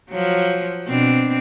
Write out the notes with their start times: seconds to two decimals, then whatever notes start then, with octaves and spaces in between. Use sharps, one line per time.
0.10 F3 F#3
0.86 B2 C4 D4